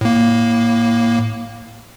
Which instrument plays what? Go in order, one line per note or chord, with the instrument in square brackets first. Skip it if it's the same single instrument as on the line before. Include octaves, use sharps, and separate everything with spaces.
[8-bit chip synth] A2 A#3